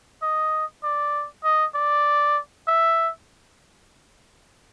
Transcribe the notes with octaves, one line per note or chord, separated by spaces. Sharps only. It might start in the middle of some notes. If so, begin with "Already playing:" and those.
D#5
D5
D#5
D5
E5